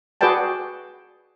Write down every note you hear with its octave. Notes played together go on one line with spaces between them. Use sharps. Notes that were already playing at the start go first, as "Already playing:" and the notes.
F#4 G#4 B4 D5 G5 A5